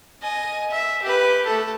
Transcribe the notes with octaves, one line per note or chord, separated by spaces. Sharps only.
D#5 G#5
E5
G4 B4
A3 A4